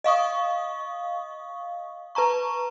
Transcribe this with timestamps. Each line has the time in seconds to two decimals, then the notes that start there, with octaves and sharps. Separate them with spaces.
0.04 D#5 F5 C#6 D#6
2.15 B4 A5 A#5 C#6